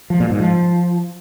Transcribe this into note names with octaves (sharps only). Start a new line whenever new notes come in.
F3
A#2
G#2
F3